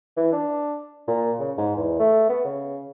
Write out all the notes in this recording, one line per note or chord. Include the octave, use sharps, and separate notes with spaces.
E3
D4
A#2
C#3
G#2
E2
A3
B3
C#3